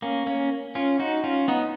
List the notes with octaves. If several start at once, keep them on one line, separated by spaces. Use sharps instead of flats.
A#3 C#4
A#3 C#4
C#4 F4
D#4 F#4
C#4 F4
B3 D#4